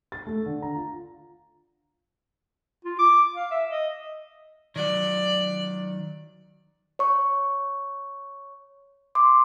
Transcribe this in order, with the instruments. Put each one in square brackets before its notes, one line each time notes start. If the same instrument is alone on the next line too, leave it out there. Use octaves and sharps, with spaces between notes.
[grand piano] A6
A3
D3
A#5
F4
[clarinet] F4
D6
F5
E5
D#5
[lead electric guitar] D#3 F#3 [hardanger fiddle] D5
[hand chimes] C#5 C#6
C6 D6